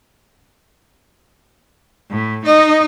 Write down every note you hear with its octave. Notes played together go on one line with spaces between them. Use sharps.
A2
D#4 D#5